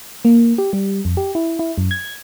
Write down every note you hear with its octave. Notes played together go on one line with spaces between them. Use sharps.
A#3
G4
G3
F2
G4
E4
E4
F#2
G#6